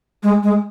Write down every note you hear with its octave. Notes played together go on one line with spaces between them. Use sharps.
G#3
G#3